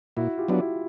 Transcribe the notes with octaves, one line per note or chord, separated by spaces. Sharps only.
A#2 E4 F#4
F4 G4
F#3 B3 D4
E4 F#4